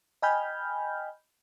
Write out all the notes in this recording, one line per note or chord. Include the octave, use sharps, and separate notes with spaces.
D#5 G5 G#5 B5 F6 G6